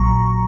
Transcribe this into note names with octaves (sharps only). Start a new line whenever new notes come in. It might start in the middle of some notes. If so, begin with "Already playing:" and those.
Already playing: A#1 A#2 F#3 A#5 C#6